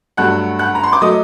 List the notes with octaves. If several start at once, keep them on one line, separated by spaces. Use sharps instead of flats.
G2 F#3 A3 F#5 F#6
F#5 F#6
A#5
C6
D6
F#3 A3 D#5 D#6